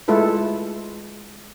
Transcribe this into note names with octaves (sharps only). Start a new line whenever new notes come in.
G#3 A3 E4 F4 A4 B4